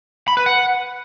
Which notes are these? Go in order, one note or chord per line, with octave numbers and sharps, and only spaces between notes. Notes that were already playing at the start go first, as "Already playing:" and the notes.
B5
B4
F#5